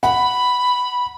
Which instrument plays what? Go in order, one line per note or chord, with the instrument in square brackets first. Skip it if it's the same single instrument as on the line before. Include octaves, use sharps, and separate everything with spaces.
[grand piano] F#5 [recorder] B5